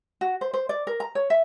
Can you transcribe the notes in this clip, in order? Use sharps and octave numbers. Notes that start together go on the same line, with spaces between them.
F#4
C5
C5
D5
A#4
A#5
C#5
E5